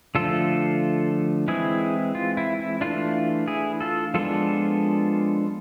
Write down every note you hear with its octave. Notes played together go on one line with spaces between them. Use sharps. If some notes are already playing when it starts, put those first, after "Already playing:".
D3 F3 A3 F4 A4
E3 G#3 C4 E4 G#4
F4
E4
E4
E3 A3 D4 F4
E4 G#4
F4 A4
F3 G#3 B3 D4 F4 A4